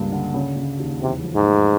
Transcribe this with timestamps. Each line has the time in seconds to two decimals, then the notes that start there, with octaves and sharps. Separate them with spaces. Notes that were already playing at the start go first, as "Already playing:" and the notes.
Already playing: C#2 G2 A#3
0.12 D3
0.34 C#3
0.56 C#3
0.79 D#2
1.01 E2 C3
1.24 F3
1.35 G#2
1.46 A3